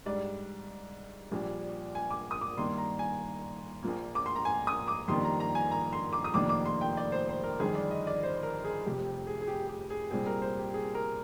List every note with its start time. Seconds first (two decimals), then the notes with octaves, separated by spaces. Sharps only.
0.06 G#2 G3 D4 D5
1.31 A#1 A#2 G3 D4
1.95 G#5
2.11 D6
2.31 D#6
2.41 D6
2.57 G2 D#3 A#3 D4 C6
2.78 A#5
2.99 G#5
3.83 A#1 A#2 F3 A#3
4.15 D6
4.26 C6
4.36 A#5
4.45 G#5
4.67 D#6
4.88 D6
5.08 F2 D#3 G3 A#3 D4 C6
5.25 A#5
5.40 A#5
5.55 G#5
5.71 A#5
5.93 C6
6.13 D6
6.24 D#6
6.34 F1 F2 D#3 A#3 D4 D6
6.49 D6
6.65 C6
6.81 G5
6.97 D5
7.12 C5
7.29 C5
7.44 A#4
7.60 G1 F2 D#3 G#4
7.75 D5
7.91 D#5
8.07 D5
8.23 C5
8.43 A#4
8.65 G#4
8.86 F1 F2 C3 G4
9.27 G#4
9.42 G#4
9.48 G4
9.69 G4
9.90 G#4
10.10 C2 A#2 G3 C4 G#4
10.26 A#4
10.42 C5
10.59 G4
10.74 G#4
10.95 A#4